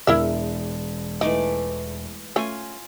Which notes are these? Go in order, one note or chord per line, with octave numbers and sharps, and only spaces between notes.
E1 E2 E4 A#4 E5
E3 A3 D#4 D5
A3 C#4 F4 G#5